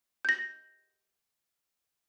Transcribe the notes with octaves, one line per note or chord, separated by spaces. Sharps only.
G6 A#6